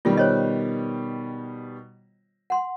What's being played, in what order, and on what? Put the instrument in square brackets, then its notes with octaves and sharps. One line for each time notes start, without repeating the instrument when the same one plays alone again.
[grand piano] B2 D#3 G3 [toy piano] F4
[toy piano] C5 C#5 D#5
F#5 C6